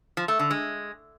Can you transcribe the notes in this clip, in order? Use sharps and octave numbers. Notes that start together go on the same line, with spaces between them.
F3
A3
D3
G#3